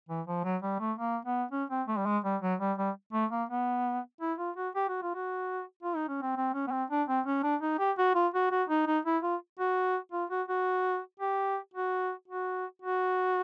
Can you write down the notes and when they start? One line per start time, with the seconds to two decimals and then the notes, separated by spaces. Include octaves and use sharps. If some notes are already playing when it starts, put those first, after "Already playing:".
0.09 E3
0.27 F3
0.44 F#3
0.63 G3
0.80 A3
0.98 A#3
1.25 B3
1.52 C#4
1.70 C4
1.88 A3
1.98 G3
2.06 G#3
2.24 G3
2.42 F#3
2.60 G3
2.78 G3
3.13 A3
3.31 A#3
3.49 B3
4.21 E4
4.38 F4
4.57 F#4
4.75 G4
4.88 F#4
5.02 F4
5.15 F#4
5.83 F4
5.96 D#4
6.09 C#4
6.22 C4
6.37 C4
6.54 C#4
6.67 B3
6.72 C4
6.90 D4
7.09 C4
7.27 C#4
7.43 D4
7.62 D#4
7.79 G4
7.98 F#4
8.15 F4
8.34 F#4
8.51 F#4
8.69 D#4
8.87 D#4
9.05 E4
9.23 F4
9.59 F#4
10.12 F4
10.30 F#4
10.49 F#4
11.20 G4
11.74 F#4
12.28 F#4
12.82 F#4